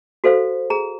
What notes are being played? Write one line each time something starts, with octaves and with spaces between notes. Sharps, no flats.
F#4 A4 C5 F5
G#4 A#5